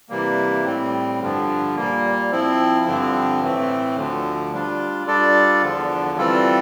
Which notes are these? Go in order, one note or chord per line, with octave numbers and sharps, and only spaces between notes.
C3 E3 G3 A#3
A2 G3 C4
G2 D3 F3
A#2 G3 A#3
F3 C4 E4
G2 D3 F3 C4
A2 E3 A3 C4
D2 D3 F3
G3 D4 F4
G3 D4 F4 A4 D5
E2 D3 F3
E3 G3 C4 F4 A4